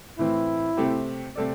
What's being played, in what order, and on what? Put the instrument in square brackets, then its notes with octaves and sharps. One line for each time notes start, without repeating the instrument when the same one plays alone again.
[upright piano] A2 E3 C4 [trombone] E4
[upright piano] C3 A3 C4 G4
C3 A3 C4 A4 D5